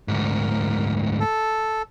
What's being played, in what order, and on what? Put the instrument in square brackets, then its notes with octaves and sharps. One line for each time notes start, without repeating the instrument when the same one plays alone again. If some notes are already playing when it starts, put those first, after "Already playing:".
[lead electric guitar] D2 G#2 [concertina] A#4
[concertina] A4